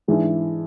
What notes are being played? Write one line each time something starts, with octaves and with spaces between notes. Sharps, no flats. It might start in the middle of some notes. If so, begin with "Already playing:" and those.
G#2 E3 G#3 D4